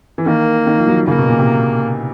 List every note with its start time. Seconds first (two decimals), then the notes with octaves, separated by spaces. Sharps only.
0.18 E3
0.26 D#3 A#3
0.67 D#3
0.78 F3
0.88 F#3
1.08 C#3 A#3
1.18 B2
1.29 A#2
1.38 C3